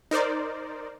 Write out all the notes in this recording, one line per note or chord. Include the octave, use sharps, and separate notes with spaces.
D#4 A#4 C5 D5